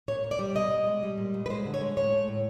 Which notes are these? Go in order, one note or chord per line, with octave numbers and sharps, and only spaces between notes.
A#2 C#5
A#2
D5
G3
B2 D#5
B2
G#3
G3
A#2
A#2
B4
G#3 C5
D3
C#5
G#3
A2 C#5
A3
A2